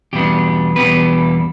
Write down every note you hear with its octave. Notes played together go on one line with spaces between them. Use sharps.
E2 B2 G3 B3 D4 G4
E2 B2 G3 B3 D4 G4 B4